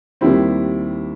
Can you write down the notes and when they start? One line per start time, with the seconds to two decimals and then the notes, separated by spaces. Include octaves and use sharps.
0.21 D#2 D#3 G3 C4 E4